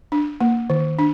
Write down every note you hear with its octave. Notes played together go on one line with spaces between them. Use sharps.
D4
A#3
D#3
D4